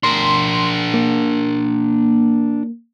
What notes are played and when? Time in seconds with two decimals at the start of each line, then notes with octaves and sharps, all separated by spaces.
0.03 D4 A#4 C6
0.94 A#3